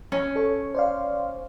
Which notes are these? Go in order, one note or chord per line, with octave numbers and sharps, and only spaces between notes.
C#4
A4 C#5
C5 D5 F5